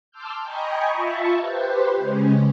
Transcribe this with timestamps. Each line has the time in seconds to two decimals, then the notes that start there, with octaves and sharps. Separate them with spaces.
0.11 A5 C6 D6 E6 F6 G6
0.43 D#5 G5 G#5 A#5 B5 C#6
0.92 F4 E5 A5 B5 C#6
1.38 G4 B4 C5
1.97 C#3 G#3 C#4